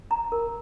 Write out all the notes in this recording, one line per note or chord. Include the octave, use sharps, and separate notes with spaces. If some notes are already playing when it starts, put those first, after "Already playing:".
A#5
A#4